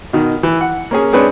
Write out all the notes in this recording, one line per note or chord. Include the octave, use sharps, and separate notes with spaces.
B2 D#3
E3
F#5
A#3 C#4 G#4
G#3 C4 D4 G#4 B4 C#5